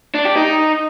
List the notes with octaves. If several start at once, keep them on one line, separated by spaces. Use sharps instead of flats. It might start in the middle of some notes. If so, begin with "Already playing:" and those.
D4
G4
D#4